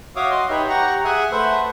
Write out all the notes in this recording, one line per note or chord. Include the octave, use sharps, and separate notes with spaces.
F#4 C#5 E5 F5 D6 D#6
F#4 D#5 C6
D#4 G4 B4 C#5 E5
G4 F#5 A#5 C#6
G#4 E5 F#5 G#5
A3 B4 C5 E5 F#5